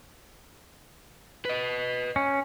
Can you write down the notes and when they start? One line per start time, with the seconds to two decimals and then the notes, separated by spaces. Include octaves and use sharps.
1.45 B4 D#5
2.16 C#4